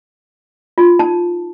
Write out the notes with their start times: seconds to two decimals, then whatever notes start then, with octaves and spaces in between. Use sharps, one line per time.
0.78 F4
0.99 D#4 A5